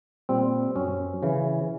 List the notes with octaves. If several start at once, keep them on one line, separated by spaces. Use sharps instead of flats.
A#2 G3 C4
F#2 C#4
C#3 E3